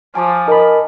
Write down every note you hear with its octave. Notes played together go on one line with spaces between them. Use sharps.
F3 G#5 A5 D6
D#4 A#4 B5